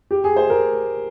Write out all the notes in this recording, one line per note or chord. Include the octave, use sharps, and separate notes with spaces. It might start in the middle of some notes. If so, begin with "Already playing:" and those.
G4
G#4
C5
A#4